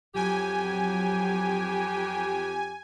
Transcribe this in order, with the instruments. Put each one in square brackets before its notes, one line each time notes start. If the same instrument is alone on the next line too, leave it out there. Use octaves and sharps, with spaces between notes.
[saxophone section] F2 G4 [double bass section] F#3 [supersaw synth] G#5